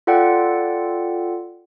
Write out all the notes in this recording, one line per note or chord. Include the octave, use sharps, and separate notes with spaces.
F4 A4 D5 F#5 G5